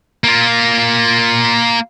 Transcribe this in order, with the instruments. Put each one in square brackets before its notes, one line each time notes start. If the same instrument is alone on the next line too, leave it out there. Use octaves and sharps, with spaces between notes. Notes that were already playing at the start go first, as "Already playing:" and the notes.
[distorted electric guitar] A#3 F4